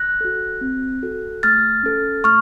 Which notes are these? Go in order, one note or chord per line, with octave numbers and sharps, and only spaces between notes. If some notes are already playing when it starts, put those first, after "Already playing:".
Already playing: F#6 A#6
F#4 A4
C4
F#4 A4
A3 F6 A6
C#4 A4
A3 C#6 F6